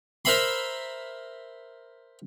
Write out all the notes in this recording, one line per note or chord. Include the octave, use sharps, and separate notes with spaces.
A#4 C5 E5 B5 C6